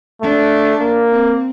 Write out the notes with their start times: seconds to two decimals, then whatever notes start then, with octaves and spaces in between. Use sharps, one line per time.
0.22 A3 D4
0.81 A#3
1.11 C4